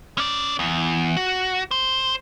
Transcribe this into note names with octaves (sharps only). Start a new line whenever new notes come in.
C#4 D5
E2
F#4
C5